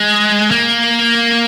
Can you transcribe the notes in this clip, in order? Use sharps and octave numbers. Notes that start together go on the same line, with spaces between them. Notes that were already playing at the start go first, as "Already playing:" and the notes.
Already playing: G#3
A#3